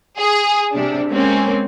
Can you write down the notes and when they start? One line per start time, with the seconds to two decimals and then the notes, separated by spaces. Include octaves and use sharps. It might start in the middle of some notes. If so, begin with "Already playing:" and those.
0.18 G#4
0.73 C3 G3 D4
1.10 G#3 A#3 C4 C#4